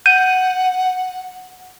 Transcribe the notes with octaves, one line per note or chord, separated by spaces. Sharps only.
F#5 G6 D#7